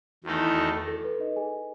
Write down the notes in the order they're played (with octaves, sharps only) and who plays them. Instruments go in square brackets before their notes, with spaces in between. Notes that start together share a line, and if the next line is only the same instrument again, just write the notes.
[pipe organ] E2 D#3 A3 D#4 A4 [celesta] F#4
[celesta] E4
F#4
A4
A4
B4
D#4 D#5
G#4 G#5